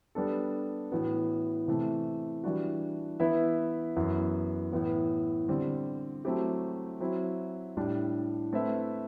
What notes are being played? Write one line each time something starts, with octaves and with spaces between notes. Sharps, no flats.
G3 B3 D4 A4
A2 E3 B3 F#4
C3 E3 A3
E3 G3 D4 F#4
E3 B3 E4 B4 E5
F#2 E3 B3
A2 E3 B3
D3 G3 C4
F#3 A3 C4 E4 G4
F#3 C4 E4
A2 G3 D4
A3 C4 E4 B4 E5